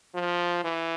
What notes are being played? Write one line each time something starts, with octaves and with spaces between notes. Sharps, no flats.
F3
E3